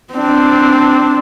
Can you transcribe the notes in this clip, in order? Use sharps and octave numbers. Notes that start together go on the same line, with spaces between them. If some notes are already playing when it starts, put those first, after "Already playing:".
C4 D4